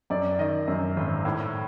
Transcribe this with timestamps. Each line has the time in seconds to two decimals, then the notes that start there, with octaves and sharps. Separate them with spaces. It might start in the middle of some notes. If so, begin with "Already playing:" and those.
0.10 F#2 D5
0.39 D#3 D#5
0.68 F#2
0.97 G#1
1.25 A2